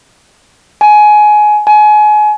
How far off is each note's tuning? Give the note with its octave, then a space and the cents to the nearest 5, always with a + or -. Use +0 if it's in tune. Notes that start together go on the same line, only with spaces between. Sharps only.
G#5 +20
G#5 +30